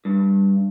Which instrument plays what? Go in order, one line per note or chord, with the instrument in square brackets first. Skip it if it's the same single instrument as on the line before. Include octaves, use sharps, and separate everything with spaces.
[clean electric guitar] G2